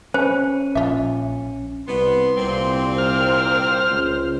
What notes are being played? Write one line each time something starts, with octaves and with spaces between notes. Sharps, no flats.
C#4 B4 C5
A#1 F4 E5
C2 B3 C6
C2 A#2 A#3 C4
C5 F6
C#2